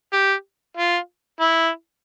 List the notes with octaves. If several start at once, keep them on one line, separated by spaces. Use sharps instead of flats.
G4
F4
E4